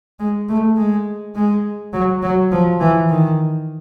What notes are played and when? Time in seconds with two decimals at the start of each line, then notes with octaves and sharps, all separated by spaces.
0.19 G#3
0.49 A3
0.77 G#3
1.35 G#3
1.93 F#3
2.22 F#3
2.52 F3
2.80 E3
3.09 D#3